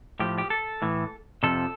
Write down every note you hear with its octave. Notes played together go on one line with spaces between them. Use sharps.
A2 F3 G4
G4
A4
A2 E3
F2 C3 F3 A4